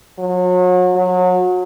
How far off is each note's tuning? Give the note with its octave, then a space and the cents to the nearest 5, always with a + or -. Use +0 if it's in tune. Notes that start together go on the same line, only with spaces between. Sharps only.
F#3 -35
F#3 -30